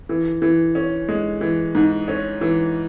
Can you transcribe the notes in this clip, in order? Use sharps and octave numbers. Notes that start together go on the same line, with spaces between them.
E3
E3
C#4
G#3
E3
G#2
C#4
E3